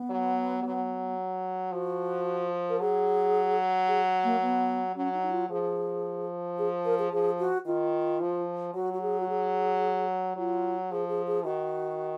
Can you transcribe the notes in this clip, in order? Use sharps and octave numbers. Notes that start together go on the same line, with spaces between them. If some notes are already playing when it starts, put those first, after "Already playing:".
Already playing: B3
F#3
F#3
F3 F#4
A#4
F#3 G#4
G#4
A#3
B3
F#3 C#4
D#4
D#4
F4
F3 G#4
G#4
A#4
G#4
F3 G#4
F#4
D#3 F4
F3
F#3 F#4
F#4
G#4
F#4
G#4
F#3 F4
F3 G#4
G#4
G#4
D#3 F#4